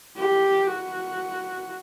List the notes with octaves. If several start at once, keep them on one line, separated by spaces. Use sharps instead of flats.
G4
F#4